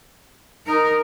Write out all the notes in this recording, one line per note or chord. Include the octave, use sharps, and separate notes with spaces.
D#4 A#4